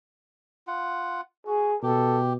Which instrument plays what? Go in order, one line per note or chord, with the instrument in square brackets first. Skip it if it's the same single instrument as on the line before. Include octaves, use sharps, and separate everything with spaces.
[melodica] F4 F#5
[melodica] F#4 [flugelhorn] G#4
[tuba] B2 [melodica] G4 [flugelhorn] A4